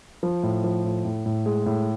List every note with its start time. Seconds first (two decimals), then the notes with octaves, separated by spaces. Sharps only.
0.23 F3
0.43 A2
0.64 F3
0.84 A2
1.05 A2
1.26 A2
1.46 G#3
1.66 A2